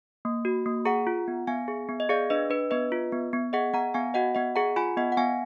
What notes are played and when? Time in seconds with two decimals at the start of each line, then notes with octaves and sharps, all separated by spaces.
0.25 A#3
0.45 F#4
0.66 A#3
0.85 G#4 F#5 A#5
1.07 F4
1.28 B3
1.47 B3 F5 G#5
1.68 G#4
1.89 B3
2.00 D#5
2.09 G#4 D5 F5
2.30 D4 B4 D#5
2.50 D4 B4
2.71 B3 B4 D#5
2.92 F4
3.12 B3
3.33 B3
3.53 G#4 D#5 F#5
3.73 B3 F#5 A#5
3.94 B3 F5 G#5
4.14 F#4 D#5 F#5
4.35 B3 D#5 F#5
4.56 G#4 F#5 A#5
4.76 F4 G#5 B5
4.97 B3 D#5 F#5
5.12 F#5
5.17 B3 F5 G#5